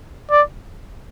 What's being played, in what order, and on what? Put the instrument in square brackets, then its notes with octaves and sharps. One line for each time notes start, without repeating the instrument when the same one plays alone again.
[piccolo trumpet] D5